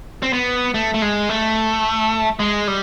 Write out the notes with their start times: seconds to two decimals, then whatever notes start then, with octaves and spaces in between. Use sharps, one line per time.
0.23 C4
0.33 B3
0.74 A3
0.94 A3
1.02 G#3
1.29 A3
2.39 G#3
2.67 G3